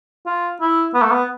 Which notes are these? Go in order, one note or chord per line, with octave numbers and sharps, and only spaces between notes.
F4
E4
B3
A3
B3